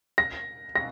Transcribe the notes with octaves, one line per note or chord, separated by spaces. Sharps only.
A#6
A#6